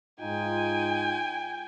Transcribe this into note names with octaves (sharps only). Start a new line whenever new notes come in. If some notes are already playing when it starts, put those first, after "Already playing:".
G#2 D#4 F4 G5 G#5